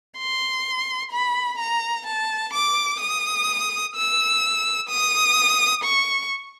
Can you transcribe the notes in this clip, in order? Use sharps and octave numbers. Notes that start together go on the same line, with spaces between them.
C6
B5
A#5
A5
D6
D#6
E6
D#6
C#6